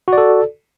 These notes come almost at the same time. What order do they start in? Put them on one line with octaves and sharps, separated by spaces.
F#4 D5 A4